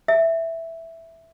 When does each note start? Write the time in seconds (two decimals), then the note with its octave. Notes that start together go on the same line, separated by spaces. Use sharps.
0.08 E5